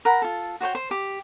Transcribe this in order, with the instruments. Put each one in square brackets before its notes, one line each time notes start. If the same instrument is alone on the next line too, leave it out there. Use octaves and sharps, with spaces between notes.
[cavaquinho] A#4 F#5 B5
F4 A4
F#4 C5 C#5 G5
C5
G4